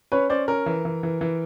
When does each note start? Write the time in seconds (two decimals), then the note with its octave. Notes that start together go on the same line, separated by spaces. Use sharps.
0.12 C#4 B4 C#5
0.30 C#4 C5 D5
0.48 C#4 A#4
0.66 E3
0.85 E3
1.03 E3
1.21 E3